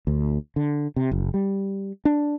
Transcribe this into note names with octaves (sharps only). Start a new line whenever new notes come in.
D2
D3
C3
F#1
G3
D4